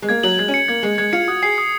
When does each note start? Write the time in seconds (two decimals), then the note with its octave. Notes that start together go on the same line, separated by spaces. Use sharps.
0.02 G#3
0.09 A#3 G#6
0.23 F#3 F#7
0.38 G#3 G#6
0.48 C#4
0.54 C#7
0.68 A#3 G#6
0.83 G#3 F#7
0.98 G#3 G#6
1.13 F4 C#7
1.28 F#4 D#6
1.42 G#4 C7
1.58 D#6